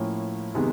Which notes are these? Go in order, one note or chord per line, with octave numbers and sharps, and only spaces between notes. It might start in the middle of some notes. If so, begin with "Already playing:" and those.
Already playing: A2 F3 A#3 C#4 E4
C3 D#3 G#3 B3